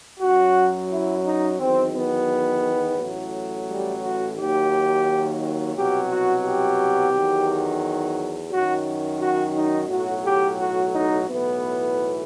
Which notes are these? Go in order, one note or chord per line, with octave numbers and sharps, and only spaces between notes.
F#2 F#3 F#4
E4
D#4
E2 D#3 F#3 C4
B3
A1 A2 F#3
G3
F#4
D#2 D#3 F#3 G4
C2 B2 F#3 G4
F#4
G4
E2 D#3 F#3
F#2 D#3 F#3 F#4
F#4
D#4
B1 A2 F#3 F#4
G4
F#4
D#4
B1 A2 E3 B3